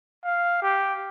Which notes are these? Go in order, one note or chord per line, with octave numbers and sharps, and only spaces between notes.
F5
G4